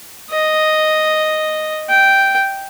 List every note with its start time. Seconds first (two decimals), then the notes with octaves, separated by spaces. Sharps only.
0.31 D#5
1.89 G5